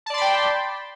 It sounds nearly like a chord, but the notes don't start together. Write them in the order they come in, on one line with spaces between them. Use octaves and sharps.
A5 D5 C6 B5 G5